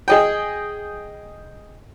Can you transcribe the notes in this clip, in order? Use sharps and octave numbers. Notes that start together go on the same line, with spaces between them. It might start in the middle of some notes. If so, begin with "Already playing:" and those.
G#4 D#5 G5